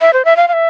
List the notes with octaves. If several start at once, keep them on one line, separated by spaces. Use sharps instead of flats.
E5
C5
E5
F5
F5
E5